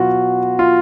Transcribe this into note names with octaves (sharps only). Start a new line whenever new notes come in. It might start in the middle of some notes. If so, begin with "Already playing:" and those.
Already playing: B2 F#3 B3 F4 F#4
F4